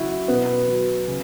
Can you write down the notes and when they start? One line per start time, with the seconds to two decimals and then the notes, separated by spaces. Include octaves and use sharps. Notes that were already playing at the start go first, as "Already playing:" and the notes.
Already playing: C#3 F#3 E4 F#4
0.28 B2 B3
0.68 F#3
1.07 C#3